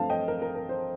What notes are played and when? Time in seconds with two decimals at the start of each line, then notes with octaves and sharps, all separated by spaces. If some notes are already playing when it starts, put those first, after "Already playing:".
Already playing: G2 F3 A3 C4 F5 A5
0.10 D#5 G5
0.28 A#4
0.42 A#4
0.55 A#4
0.69 C5